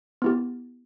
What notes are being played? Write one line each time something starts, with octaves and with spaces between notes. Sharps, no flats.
B3 E4 G4